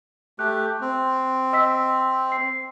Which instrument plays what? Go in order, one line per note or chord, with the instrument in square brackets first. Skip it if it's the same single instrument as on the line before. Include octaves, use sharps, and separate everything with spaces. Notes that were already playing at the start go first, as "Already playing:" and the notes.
[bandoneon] A3 G4 [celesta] F#6
[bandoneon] C4
[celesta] D#5 E6 B6
C7